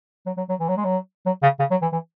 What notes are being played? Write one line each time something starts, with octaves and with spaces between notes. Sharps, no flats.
F#3
F#3
F#3
E3
F#3
G#3
F#3
F#3
C#3
C#3
F#3
E3
E3